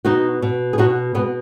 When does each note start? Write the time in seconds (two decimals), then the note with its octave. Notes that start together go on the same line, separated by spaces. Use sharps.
0.05 B2 D#4 F#4
0.42 B2
0.73 G#4
0.78 B2 D#4 F#4
1.15 B2 G#3 B3